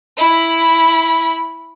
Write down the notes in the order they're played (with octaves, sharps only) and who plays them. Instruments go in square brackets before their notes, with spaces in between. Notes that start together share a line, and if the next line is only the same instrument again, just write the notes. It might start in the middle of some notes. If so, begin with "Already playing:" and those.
[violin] E4 B5